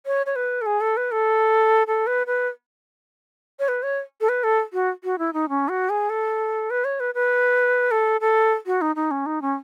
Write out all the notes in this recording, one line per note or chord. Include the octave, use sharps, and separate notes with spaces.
C#5
C#5
B4
A4
G#4
A4
B4
A4
A4
B4
B4
C#5
B4
C#5
A4
B4
A4
F#4
F#4
E4
D#4
C#4
F#4
G#4
A4
B4
C#5
B4
B4
A4
A4
F#4
D#4
D#4
C#4
D#4
C#4